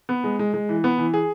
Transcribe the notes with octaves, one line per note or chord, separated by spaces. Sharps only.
B3
G#3
G#3
G#3
E3
B3
E3
G#4